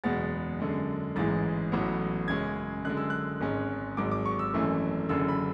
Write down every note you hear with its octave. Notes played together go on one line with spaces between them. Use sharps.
F#1 E2 B2 G#3 B3 A6
F#2 D3 G#3
A1 G#2 E3 G#3 A6
A1 A2 F#3 B3
F#2 C#3 G#3 C#4 G#6
F#2 D3 G#3 F#6
E6
F#6
G#1 G#2 G#3 C#4
G#1 G#2 F#3 D6
D6
C#6
E6
G#1 F#2 E3 A3
F#1 F#2 D3 E6
B5